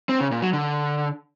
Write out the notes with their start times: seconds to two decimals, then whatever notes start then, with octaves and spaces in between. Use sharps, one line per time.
0.09 C4
0.20 C#3
0.31 A#2
0.42 F#3
0.53 D3